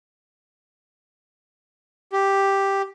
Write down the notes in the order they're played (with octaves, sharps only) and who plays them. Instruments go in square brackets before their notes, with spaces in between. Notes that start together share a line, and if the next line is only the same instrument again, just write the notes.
[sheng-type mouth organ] G4